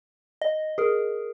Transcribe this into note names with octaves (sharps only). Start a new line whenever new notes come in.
D#5
G#4 A#4